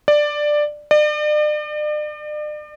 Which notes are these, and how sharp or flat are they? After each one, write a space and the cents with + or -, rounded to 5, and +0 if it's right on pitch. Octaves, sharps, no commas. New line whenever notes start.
D5 +10
D5 +40